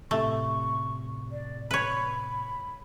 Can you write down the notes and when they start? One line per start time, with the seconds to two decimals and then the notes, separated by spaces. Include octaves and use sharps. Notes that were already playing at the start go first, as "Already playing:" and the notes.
0.11 A2 C3 A3 C#6
1.32 D5
1.71 B4 C#5 B5